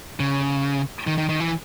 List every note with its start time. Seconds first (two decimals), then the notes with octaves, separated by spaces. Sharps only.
0.20 C#3
1.07 D#3
1.18 D#3
1.29 D#3
1.40 E3